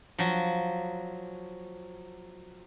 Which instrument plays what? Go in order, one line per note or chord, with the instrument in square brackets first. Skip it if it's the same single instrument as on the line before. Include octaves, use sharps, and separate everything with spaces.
[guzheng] F3 F#3